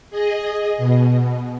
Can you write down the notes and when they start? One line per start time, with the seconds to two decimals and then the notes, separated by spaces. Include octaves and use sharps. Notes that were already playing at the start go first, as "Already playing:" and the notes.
0.10 G#4 D#5
0.78 B2